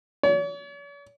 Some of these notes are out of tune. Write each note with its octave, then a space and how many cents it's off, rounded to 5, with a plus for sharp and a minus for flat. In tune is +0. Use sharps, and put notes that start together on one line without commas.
C#5 +45